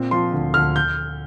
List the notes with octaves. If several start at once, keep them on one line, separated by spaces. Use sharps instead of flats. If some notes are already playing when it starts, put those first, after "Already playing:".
Already playing: A#2 C4
F3 C6
D2
D2 F6
G6